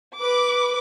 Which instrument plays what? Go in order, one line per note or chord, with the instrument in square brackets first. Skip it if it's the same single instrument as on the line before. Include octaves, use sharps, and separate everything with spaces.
[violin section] B4 D6